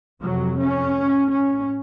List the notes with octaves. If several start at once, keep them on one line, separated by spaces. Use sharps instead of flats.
F2 C3 F#3
C#4
A2
C#4